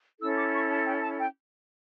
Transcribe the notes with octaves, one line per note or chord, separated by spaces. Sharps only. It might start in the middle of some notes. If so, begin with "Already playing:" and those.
C#4 E4 A4 E6
D6
C#6
A5
G5
A5
G5